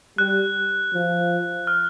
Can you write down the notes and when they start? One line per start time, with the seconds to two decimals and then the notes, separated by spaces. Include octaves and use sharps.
0.18 G3 F#6
0.93 F3
1.67 F6